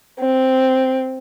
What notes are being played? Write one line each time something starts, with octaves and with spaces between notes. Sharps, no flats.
C4